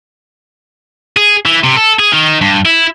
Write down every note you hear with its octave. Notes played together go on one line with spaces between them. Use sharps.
G#4
E3
C3
A4
G#4
D#3
G2
E4